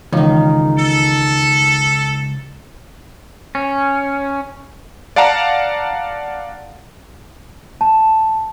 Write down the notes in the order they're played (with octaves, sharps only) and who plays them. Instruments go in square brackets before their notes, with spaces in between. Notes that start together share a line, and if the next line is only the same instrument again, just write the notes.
[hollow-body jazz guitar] C#2 [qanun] D#3 D#4 [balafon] E3
[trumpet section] A4
[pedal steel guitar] C#4
[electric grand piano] D5 F5 F#5 A5 A#5
[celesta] A5